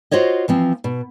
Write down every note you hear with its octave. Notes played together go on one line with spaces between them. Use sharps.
F4 F#4 C5 C#5 D#5
E3 F3 C4
B2